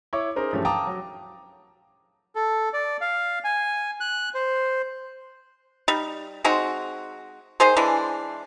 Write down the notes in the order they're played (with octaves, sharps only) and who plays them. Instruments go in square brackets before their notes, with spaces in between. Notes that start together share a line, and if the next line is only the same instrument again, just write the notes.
[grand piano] E4 C#5 C#6 D6
C#4 D#4 G#4 A#4 C5
G2 E3 F3 A3 C#4 G4
F5 G5 A5 A#5 D6 D#6
F#3
[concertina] A4
D5
F5
G#5
F#6
C5
[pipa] G3 D#4
G#3 C4 D#4 F#4
D#3 G#4 C5
E3 G#3 D4